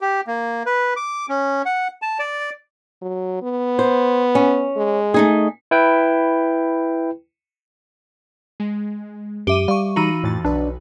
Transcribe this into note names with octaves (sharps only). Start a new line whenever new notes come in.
G4
A#3
B4
D6
C#4
F#5
A5
D5
F#3
B3
C5
C#4
G#3
A3 D#4 G#4
E4 B4 G5
G#3
F#2 G4 E5 D6 D#7
G3 F5 C#6
E3 D#4 F#4 A#5 D#7
F2 A2 A6
B1 D4 B4